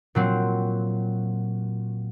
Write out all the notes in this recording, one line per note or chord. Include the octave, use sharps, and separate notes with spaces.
A#2 F#3 C4